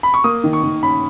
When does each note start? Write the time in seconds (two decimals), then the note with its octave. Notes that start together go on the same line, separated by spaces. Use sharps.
0.03 B5
0.14 C#6
0.24 A#3 D#6
0.44 D#3
0.53 C#6
0.63 D#3
0.83 C#4 B5